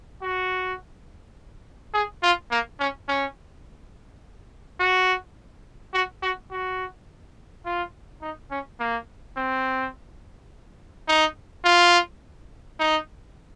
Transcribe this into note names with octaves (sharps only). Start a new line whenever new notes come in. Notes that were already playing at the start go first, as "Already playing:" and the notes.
F#4
G#4
F4
A#3
C#4
C#4
F#4
F#4
F#4
F#4
F4
D#4
C#4
A#3
C4
D#4
F4
D#4